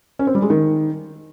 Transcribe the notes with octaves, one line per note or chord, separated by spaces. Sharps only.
C#4
C4
G3
G#3
D#3